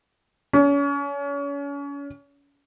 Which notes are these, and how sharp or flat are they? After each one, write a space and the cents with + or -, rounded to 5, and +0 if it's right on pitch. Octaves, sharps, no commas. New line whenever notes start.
C#4 +35